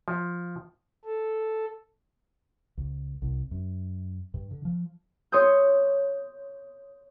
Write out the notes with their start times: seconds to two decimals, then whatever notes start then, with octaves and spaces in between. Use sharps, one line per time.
0.08 F3
1.05 A4
2.77 C#2
3.22 C2
3.51 F#2
4.34 G2
4.51 D3
4.65 F3
5.32 C#5 C6 D#6 E6 G6